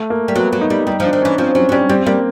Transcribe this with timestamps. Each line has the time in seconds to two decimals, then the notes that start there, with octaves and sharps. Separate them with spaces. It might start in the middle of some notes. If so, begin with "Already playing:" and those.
Already playing: A3
0.10 A#3
0.28 G3
0.36 F#3 B3
0.53 F#3
0.61 D#4
0.70 G3
0.87 G3 D#4
1.00 F3
1.04 D4
1.13 D#3
1.22 E3 C#4
1.38 F3 C4
1.55 F#3 C#4
1.69 F#3
1.72 G3 C#4
1.89 G3 C4
2.06 G3 A#3